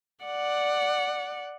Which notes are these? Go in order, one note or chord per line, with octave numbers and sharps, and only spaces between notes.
D5 F#5